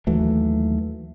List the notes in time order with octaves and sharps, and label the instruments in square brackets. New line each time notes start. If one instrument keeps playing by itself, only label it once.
[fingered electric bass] D#2 E3 F#3 A3